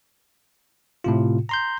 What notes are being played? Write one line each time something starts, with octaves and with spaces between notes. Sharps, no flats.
A2 C3 F4
A#5 C6 G6